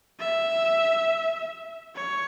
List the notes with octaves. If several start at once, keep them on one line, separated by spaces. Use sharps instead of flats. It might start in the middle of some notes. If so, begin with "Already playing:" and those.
E5
C#5